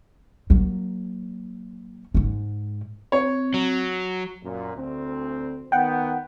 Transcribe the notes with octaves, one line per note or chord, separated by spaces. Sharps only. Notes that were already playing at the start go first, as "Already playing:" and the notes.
F#3 A#3
G#2 G#3
C4 C#5
F#3
F#2 A#2
D2 C4
D#3 B3 F#5 G5